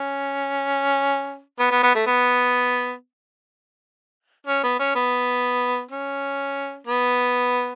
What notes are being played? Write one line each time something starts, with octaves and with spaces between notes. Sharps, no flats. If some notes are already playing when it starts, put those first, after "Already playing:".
Already playing: C#4
B3
B3
B3
A3
B3
C#4
B3
C#4
B3
C#4
B3